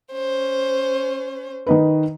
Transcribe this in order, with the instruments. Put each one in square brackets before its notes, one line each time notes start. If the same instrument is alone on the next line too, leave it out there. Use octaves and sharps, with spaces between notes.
[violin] C#4 C5
[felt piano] D#3 D#4 B4